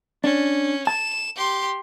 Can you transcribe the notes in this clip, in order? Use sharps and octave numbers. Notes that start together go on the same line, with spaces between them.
C#4 D4
A5 E7
G4 C6